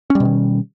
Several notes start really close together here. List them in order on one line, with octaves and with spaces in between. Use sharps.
C#4 G3 B2 D#3